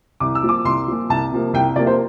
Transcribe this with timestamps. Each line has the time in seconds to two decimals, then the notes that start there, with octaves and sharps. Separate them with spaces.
0.20 C2 D6
0.35 E6
0.43 A#2 F3
0.49 D6
0.65 C2 C6
0.87 A#2 F3
1.10 C2 A5
1.32 C3 F3 A#3
1.53 C2 G5
1.76 C3 F3 A#3 D5
1.87 C5